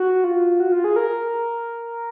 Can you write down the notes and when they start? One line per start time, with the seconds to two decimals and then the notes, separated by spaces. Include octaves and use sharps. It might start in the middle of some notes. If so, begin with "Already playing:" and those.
Already playing: F#4
0.24 F4
0.60 F#4
0.72 F4
0.84 G#4
0.96 A#4